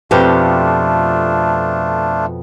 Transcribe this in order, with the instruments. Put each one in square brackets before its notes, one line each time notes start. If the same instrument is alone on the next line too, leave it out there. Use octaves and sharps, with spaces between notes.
[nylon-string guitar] F2 B2 G4 [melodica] A3 D4 F4